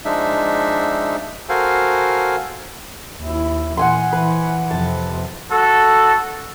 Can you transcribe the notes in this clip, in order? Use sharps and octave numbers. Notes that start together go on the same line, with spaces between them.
F3 G#3 D4 D#4 E5
F#4 A4 A#4 C5 F5 G#5
D#2 E4
A#2 E3 F#5 G#5 C6
E3 B4
F2 C3 A5
F#4 A4